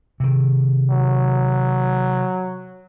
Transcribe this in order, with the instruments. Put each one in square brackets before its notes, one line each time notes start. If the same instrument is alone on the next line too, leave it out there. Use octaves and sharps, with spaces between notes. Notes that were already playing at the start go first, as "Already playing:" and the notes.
[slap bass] C3 D#3
[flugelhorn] F#3